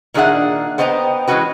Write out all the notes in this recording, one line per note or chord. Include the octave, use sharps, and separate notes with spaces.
A#2 D#3 D4 G#4 E5 F#5
B3 C5 D#5 G5 A5 A#5
E3 G#3 A3 C#4 F#4 B4